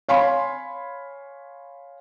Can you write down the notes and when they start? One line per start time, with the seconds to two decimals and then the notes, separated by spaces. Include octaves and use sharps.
0.09 C#5 F5 G#5 B5 C6